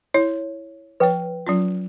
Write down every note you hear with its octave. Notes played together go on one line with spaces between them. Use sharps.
E4 C#5
F3 B4 C#5 G5
F#3 C#4 F4